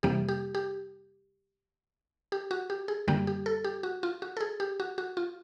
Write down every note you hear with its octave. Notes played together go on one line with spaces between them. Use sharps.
F2 C3 E3 G3 A#3 G4
G4
G4
G4
F#4
G4
G#4
F#2 D3 G3 A#3 G4
G4
A4
G4
F#4
F4
F#4
A4
G#4
G4
F#4
F#4
F4